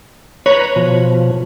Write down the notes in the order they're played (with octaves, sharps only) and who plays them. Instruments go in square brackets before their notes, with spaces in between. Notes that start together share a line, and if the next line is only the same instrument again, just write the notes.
[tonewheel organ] B4 A#5 B5 [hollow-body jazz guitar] C#5
[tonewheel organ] B2 F3